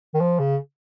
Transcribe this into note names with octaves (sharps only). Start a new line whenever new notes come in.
D#3
F3
C#3